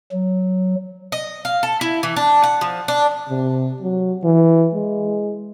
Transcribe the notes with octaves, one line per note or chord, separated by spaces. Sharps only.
F#3
D#5
F5
A4
E4
E3
D4
F#5
F3
D4
C3
F#3
E3
G#3